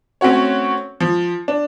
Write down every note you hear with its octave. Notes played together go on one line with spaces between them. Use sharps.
A3 C4 C#4 F#4 C#5
F3
D4